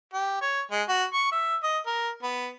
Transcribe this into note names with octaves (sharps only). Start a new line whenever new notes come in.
G4
C#5
G#3
F#4
C#6
E5
D#5
A#4
B3